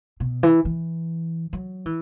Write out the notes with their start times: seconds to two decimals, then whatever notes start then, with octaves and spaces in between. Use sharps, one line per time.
0.20 B2
0.43 E3
0.65 E3
1.53 F#3
1.86 E3